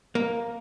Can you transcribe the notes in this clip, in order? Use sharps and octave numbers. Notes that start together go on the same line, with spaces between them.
A#3